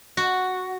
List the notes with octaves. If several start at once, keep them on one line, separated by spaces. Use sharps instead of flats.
F#4